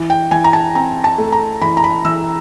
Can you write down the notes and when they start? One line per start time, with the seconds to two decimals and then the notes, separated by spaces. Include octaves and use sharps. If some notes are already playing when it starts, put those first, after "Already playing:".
Already playing: E3
0.10 G5
0.31 E3 G#5
0.44 A#5
0.53 A5
0.75 C4 A#5
1.04 A5
1.18 A3
1.32 A#5
1.61 E3 B5
1.77 A#5
1.84 B5
2.05 E3 E6